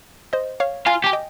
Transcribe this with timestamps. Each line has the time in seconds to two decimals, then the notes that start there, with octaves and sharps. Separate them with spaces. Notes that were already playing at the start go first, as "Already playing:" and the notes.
0.33 C5 D#5
0.60 C#5 F5
0.86 F4 F5 G#5
1.04 G4 G#5
1.13 D#5 G5